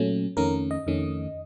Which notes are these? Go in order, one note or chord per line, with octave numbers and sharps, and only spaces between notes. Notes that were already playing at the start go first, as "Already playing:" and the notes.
Already playing: A#2 F#3 A3 C#4
F2 D#3 A3 C#4 A#4
D#5
F2 D#3 A3 C#4